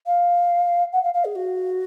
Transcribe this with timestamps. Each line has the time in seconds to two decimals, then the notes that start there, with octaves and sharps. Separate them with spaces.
0.06 F5
0.93 F#5
1.03 F5
1.14 F5
1.25 G#4
1.36 F#4